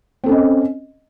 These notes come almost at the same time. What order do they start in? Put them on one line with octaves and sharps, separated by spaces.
C4 A4 C#4 D#5